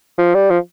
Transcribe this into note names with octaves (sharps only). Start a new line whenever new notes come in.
F3
G3
F3